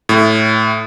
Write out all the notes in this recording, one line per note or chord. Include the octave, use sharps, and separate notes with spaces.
A2